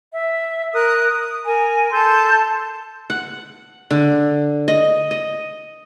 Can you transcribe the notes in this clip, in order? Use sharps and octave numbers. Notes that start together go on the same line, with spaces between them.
E5
A#4 D#6 F#6
D#6
A#4 G#5
A4 A5 C6 G6
F#5
D3
D#5
D#5